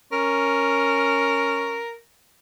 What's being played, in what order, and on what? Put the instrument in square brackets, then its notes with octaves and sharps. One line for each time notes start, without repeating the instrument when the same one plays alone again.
[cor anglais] C#4 [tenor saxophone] A#4